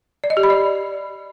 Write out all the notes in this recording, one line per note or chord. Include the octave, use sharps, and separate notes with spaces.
D5
D#5
G4
B5
D5